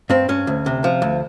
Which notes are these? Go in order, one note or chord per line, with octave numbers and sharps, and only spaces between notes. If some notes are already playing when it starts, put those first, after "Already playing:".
G2 C4
G2 C#4
D2
C3
F3
D2